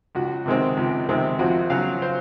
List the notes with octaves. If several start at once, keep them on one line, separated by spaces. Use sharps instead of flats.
C#2 F#4
C3 D#3 G#3 C4
C#2
C3 D#3 G#3 C4
F2 F#4
C#3 F#3 F5
C5